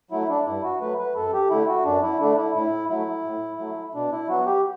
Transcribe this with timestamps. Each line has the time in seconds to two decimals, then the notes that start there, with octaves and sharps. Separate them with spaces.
0.11 F#3 A3 E4
0.29 D4
0.46 G2 E4
0.64 F#4
0.81 F#3 A3 B4
0.98 B4
1.15 F#2 A4
1.33 G4
1.50 D3 A3 E4
1.68 F#4
1.85 F#2 D4
2.02 E4
2.20 D3 A3 D4
2.37 E4
2.55 A2 E4
2.89 F#3 A3 E4
3.24 A2
3.59 F#3 A3
3.95 B2 D4
4.12 E4
4.28 F#3 B3 F#4
4.46 G4